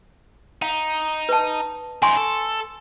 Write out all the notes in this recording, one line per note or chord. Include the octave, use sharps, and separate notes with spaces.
D#4 F5
B4 A5
F#2 D#4 G#5 C6 C#6
A4